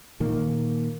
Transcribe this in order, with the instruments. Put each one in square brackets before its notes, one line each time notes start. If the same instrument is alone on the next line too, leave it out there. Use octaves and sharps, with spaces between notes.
[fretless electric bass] A#2 D#3 A#3